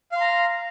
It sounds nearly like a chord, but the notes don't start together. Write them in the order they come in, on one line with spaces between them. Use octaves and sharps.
F5 C6 A#5